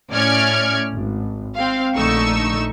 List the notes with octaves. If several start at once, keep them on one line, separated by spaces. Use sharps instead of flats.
A2 C#4 D5 F6 G#6 C#7
G#1
C4 F5
A#1 D3 A3 D#4 C#6 E6